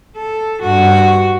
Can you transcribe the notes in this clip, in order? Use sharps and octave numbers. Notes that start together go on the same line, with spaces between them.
A4
G2 F#4